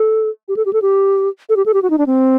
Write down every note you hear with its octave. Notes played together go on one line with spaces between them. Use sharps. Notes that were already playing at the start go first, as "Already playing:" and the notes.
Already playing: A4
G4
A4
G4
A4
G4
A4
G4
A4
G4
F#4
D#4
D4
C4